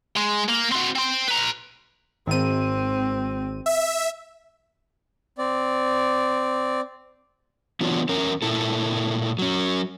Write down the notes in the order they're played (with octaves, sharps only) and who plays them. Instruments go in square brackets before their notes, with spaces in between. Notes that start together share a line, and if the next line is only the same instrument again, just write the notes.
[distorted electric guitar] G#3
A#3
C4 F#4
C4 C6
B4 A#5
[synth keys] G#1 D#7 [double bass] C4
[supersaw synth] E5
[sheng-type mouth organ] C4 D5
[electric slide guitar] E3 F#3 B3 D4 F4 C#5
E2 C#4 A#4
A#2 E4 A4
F#3 C#4